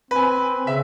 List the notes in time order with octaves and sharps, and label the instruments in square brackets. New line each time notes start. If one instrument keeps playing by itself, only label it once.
[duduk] C4 [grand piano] B4 G#5
[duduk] C#3 [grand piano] E5